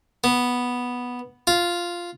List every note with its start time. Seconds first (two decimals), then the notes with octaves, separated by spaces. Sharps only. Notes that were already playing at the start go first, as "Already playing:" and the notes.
0.24 B3
1.47 F4